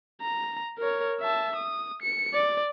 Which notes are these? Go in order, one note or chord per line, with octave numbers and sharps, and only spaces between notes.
A#5
A#4 C#5
E5 A5
D#6
C#7
D5